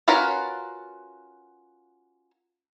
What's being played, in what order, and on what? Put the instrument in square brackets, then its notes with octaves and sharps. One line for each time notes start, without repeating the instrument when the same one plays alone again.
[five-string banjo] C#4 F4 F#4 A#4 B4